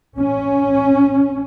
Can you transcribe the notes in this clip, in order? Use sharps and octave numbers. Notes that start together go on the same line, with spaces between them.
C#4